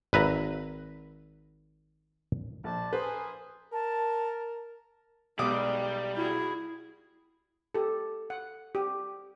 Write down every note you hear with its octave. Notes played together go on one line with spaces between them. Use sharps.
G#1 B4 E5 A#5
A#1 C5 D5 A5
A#3 G#4 B4 C5
A#4 A5
B1 G3 G#3 D5 D6 D#6
E4 F#4 G#4
G4 A4
F#5
G4